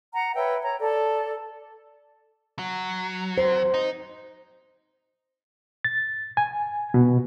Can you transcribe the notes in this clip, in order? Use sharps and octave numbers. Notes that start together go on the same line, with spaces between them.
F#5 A#5
B4 C#5 E5 G5
C#5 A#5
A4 D5
F#3
C5
D#4
A6
G#5
B2